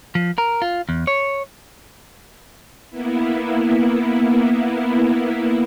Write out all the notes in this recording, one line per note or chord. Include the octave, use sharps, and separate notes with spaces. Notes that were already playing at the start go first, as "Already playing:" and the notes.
F3
A#4
F4
E2
C#5
A#3 B3 E4